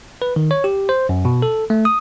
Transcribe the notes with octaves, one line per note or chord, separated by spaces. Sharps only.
B4
D#3
C#5
G4
C5
F#2
B2
A4
A3
D#6